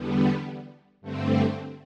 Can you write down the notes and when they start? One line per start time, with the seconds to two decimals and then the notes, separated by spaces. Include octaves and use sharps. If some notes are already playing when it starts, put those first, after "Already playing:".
Already playing: E2 D3 G3 B3
1.01 G2 D3 A3 C4